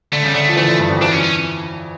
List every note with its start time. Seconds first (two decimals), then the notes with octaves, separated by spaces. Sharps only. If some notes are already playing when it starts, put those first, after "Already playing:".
0.12 D3 A3
0.23 C#3 G3
0.35 D3 A3
0.49 F3
0.57 E3 A3
0.68 D3
0.79 G2
0.90 F2
1.01 E3 D4
1.12 C#4
1.24 C#4